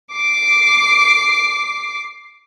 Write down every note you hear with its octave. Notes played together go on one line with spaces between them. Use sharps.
D6 C7